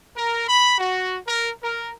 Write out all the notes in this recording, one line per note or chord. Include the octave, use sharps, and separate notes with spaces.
A#4
B5
F#4
A#4
A#4